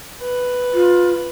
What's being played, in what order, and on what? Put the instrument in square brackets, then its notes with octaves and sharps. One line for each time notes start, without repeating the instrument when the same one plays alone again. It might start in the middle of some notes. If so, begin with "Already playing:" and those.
[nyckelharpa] B4
[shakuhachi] F4